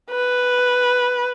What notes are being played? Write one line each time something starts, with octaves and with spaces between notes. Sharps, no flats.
B4